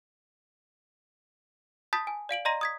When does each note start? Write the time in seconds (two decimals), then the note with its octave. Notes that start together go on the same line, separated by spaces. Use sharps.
1.93 A5 B5 D#6 G6 A6 B6
2.07 G#5
2.29 D5 F5 D7 F#7
2.45 D5 D#5 A#5 C6 A#6 D#7
2.61 D#6 G#6 B6